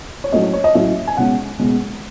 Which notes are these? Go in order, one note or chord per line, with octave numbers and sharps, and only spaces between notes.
C#5
A2 F#3 A3 C#4 D#5
C#5
C#5
D#5
A2 F#3 A3 C#4 E5
G#5
B2 G#3 C#4 F#5
B2 G#3 C#4